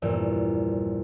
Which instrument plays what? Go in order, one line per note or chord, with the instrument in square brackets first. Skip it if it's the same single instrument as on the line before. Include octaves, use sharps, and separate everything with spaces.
[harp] A#1 E2 G2